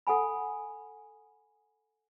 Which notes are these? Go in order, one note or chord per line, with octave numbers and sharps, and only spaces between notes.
A4 F#5 G#5 B5